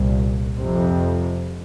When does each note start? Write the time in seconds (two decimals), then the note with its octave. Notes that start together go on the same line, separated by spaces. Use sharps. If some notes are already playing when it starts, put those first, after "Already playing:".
Already playing: C2 A#2
0.58 F2 C3